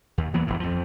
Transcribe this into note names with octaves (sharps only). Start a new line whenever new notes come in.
D#2
E3 F#3 A#3 B3
E1 A#1 A2
F2 F3